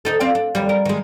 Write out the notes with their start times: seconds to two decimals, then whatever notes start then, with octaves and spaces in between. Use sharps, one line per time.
0.05 D2 D#4 A4
0.20 C4 F4 D5
0.35 D4
0.55 D#2 G3
0.69 A#4
0.85 D#3 G#3